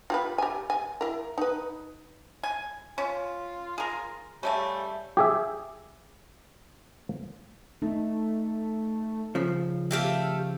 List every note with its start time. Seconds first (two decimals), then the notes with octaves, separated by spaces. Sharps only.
0.10 F4 G4 B4
0.38 G4 G#5
0.70 G#5
1.01 E4 A#4
1.38 D#4 B4
2.43 G#5
2.98 C#4 F4
3.78 G#4 A#4
4.43 C#3 G3 A3 C#4
5.17 G4 G#4 E5
7.82 A3 D#4
9.35 C#3 F3
9.91 A3 G4 F5 E6